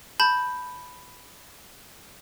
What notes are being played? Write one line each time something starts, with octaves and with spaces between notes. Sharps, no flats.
A5 B5 G6